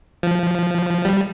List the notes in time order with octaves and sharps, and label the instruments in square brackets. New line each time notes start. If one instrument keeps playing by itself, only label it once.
[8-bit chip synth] F3
G3